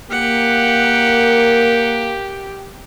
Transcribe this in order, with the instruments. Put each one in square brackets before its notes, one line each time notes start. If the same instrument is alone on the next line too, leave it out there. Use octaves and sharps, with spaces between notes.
[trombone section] A#3 [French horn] G4 [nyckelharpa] F#5